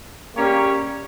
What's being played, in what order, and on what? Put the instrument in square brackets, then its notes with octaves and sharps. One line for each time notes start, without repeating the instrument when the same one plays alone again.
[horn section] C#3 G3 C#4 G4 C#5 [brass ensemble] A#3